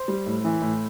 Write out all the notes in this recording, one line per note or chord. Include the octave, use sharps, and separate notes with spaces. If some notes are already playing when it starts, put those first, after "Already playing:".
Already playing: C5 C6
G3
A2
E3
A2